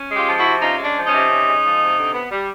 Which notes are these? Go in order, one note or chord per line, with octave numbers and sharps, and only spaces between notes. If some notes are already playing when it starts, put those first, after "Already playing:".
Already playing: C#4
G#3
F4 G4
F3
E4 F#4
C3
C#4 D#4 F4
G#3
D4
F3
C#4 D#4
C3
C#4
G#3
F3
C3
D3
B3
G3